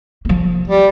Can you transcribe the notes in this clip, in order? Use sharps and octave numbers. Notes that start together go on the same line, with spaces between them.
F3 A#3
G3